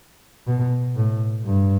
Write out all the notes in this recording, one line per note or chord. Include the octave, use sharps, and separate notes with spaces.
B2
A2
G2